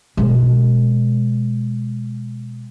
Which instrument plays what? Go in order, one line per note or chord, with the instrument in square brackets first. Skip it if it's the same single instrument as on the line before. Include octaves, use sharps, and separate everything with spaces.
[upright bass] B2 G#3